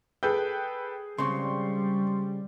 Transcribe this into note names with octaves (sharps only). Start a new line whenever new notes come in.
G#4 A4 B4 G5 G6
C#3 G3 G#3 C4 C6 C#6